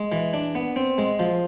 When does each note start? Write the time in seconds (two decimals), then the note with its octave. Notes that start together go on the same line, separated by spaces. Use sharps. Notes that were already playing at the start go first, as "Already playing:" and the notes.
Already playing: G#3
0.12 E3
0.33 D4
0.55 B3
0.76 C4
0.98 G#3
1.19 F3